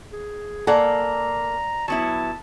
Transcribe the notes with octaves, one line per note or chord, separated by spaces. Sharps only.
G#4
A#3 A4 D5 F#5 G#5 A#5
F#3 B3 E4 A5